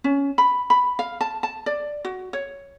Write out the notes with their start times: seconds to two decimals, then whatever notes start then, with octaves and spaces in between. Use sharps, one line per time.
0.04 C#4
0.38 B5
0.70 B5
0.99 F5
1.21 A5
1.43 A5
1.66 D5
2.05 F#4
2.33 C#5